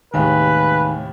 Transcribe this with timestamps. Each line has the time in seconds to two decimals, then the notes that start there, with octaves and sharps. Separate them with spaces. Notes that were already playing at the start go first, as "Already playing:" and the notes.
0.14 D#2 A2 C3 D#3 G#3 B4 F5 G#5